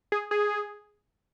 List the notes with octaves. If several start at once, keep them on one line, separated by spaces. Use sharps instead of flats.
G#4
G#4